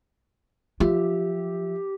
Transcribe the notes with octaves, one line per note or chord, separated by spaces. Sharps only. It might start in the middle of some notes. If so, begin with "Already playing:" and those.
F3 F4 G4 E5